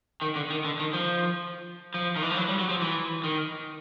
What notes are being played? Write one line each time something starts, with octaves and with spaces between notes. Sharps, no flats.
D#3
D3
D#3
D3
D#3
F3
F3
D#3
E3
F3
F#3
G3
F#3
F3
E3
D#3